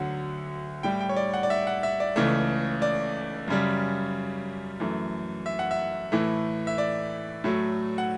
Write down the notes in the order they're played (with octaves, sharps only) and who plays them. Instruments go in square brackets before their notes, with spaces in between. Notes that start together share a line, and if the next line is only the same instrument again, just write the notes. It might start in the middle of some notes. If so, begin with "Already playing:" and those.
Already playing: [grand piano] D2 D3 F#3 F#5
A2 G3 G5
G5
C#5
D5
F#5
D5
E5
F#5
E5
D5
C#2 C#3 E3 A3
D5
F#2 C#3 G3
F#2 E3 A3
E5
F#5
E5
A2 E3 A3
E5
D5
A2 F#3 A3
F#5